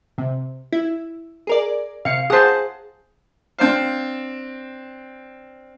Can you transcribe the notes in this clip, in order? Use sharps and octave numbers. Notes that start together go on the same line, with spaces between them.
C3
E4
G#4 A#4 D5
C3 F5 C#7
G#4 C5 F#5 A5
C4 D4 C5 F5